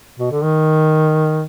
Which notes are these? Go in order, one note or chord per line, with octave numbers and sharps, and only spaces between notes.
B2
D3
D#3